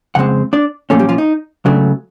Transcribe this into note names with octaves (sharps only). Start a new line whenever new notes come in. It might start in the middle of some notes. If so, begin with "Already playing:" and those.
F2 C#3 G#3 C4 F#5
D4 D5
A#2 F3 A3 A#3 C#4 A4
G3 G4
F3 F4
D#4
C#2 C#3 F#3 A3 D4